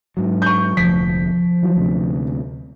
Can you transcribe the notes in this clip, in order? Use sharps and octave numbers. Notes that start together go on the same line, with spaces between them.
G#2 F#3
C#6 G6
F1 D2 F3 B6
E3 F#3
D2 C3